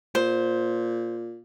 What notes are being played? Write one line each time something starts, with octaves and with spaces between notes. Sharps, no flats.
A#2 C5